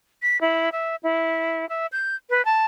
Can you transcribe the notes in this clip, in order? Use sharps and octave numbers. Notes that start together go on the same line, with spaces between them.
B6
E4
E5
E4
E5
G6
B4
A5